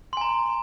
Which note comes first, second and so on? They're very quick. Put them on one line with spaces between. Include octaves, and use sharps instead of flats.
C6 G#5 A#5